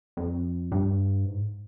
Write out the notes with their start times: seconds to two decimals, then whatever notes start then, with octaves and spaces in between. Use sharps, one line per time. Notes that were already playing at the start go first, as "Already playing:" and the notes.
0.17 F2
0.72 G2
1.25 G#2